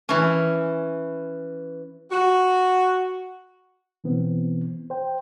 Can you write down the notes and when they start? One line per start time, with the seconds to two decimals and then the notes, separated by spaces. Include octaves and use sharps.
0.09 E3 C#4
2.11 F#4
4.04 B2 E3 B3 C4
4.90 C5 G5